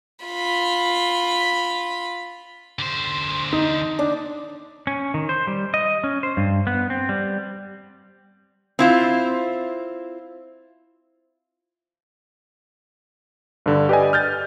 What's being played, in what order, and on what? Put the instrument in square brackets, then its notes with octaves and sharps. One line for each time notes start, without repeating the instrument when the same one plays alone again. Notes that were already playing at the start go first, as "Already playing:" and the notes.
[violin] F4 B5
[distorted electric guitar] D3 C5
[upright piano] D#4
[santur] D4
[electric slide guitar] C#4
D#3
C5
G3
D#5
C#4
C5
G2
B3
C4
G3
[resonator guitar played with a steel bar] C4 E4 F4
[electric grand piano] G2 D3
G4 B4 D5 D#5 G#5
F6 G6 A6